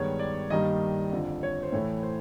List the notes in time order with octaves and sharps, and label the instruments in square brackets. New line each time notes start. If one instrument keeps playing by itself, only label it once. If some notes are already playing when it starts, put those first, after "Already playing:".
Already playing: [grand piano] G2 D#3 G#3 B3 C#5
D5
G2 D#3 G3 A#3 D#5
F2 D3 F3
C#5
C5
A2 E3 A3 C#5
C5